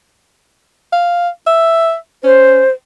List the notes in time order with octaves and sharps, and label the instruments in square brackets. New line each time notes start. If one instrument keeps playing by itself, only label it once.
[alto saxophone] F5
E5
[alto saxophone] C#4 [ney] C5